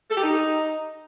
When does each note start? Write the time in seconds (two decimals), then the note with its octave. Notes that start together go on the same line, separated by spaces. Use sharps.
0.11 A4
0.17 G4
0.24 D#4